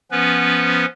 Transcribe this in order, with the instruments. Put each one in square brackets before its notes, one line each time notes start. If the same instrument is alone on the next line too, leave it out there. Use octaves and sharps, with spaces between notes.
[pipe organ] F3 B3 C#4 B4